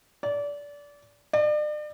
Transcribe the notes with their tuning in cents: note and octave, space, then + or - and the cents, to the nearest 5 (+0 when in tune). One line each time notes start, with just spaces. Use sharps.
D5 -25
D5 +40